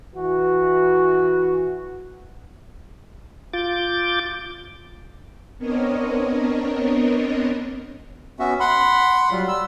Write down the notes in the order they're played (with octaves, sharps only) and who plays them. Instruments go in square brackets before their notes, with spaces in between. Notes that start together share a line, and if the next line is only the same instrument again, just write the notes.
[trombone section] E3 F#4
[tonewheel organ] F4 D6 G6 A6
[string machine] B3 C4 D4 A#4 C#5 D#5
[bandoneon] B3 C#4 F#4 E5
F#5 B5 C6
F#3 G3 F4
E6